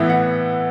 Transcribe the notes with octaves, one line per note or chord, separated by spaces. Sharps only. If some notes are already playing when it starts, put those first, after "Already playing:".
Already playing: A2 E3 B3 E5
F#5